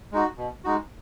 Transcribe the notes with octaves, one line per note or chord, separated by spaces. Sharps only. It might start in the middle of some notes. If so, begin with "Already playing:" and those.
G#3 D#4 F#4
B2
G#3 D#4 F#4